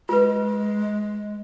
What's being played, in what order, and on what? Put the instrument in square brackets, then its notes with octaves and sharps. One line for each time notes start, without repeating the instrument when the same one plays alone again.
[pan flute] G#3 [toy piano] F4 B4